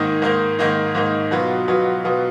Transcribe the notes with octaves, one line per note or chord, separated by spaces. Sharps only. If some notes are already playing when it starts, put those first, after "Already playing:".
Already playing: G#2 D#3 A#3 D#4
G#2 D#3 A#3 D#4
G#2 D#3 A#3 D#4
G#2 D#3 A#3 D#4
B2 F#3 B3 F4
B2 F#3 B3 F4
B2 F#3 B3 F4